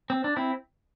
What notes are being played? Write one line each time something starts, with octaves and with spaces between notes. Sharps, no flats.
C4
D4
C4 E4